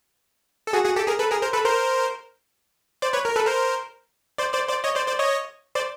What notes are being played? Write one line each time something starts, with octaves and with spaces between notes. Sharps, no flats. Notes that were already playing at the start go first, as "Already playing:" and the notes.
A4
F#4 G#4
F#4 G#4
G4 A4
G#4 A#4
A4 B4
G#4 A#4
A#4 C5
A4 B4
A#4 C5
C5 D5
B4 C#5
A#4
A4 B4
A#4 C5
C5 D5
C5 D5
C5 D5
C#5 D#5
C5 D5
C5 D5
C#5 D#5
C5 D5